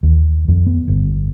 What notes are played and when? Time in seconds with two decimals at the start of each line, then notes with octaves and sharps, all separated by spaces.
0.03 D#2
0.48 F2
0.67 B3
0.88 G1